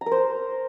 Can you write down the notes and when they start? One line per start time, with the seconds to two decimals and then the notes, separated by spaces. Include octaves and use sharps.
0.01 A#5
0.06 A#4
0.11 C5